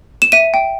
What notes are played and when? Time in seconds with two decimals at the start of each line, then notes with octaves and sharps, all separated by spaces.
0.22 E7
0.32 E5 D#7
0.54 G5